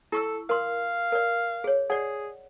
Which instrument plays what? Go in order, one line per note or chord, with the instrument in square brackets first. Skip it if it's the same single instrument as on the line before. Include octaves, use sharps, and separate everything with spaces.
[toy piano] E4 C#6 E6 [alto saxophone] A4
[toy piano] A#4 C6 [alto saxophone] F5
[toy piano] A#4 D5
G#4 C#5
[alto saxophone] G#4 [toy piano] D5 F#5